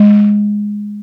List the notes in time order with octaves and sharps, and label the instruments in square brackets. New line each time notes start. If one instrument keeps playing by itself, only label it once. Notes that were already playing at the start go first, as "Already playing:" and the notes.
Already playing: [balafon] G#3